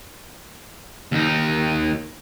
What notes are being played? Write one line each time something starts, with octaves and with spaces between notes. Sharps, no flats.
D#2 D#4